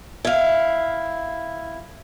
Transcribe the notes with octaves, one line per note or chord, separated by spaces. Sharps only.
E4 F5